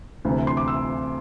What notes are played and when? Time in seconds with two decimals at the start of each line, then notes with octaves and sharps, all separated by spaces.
0.25 D2 C3 E3
0.47 C6
0.57 D6
0.68 E6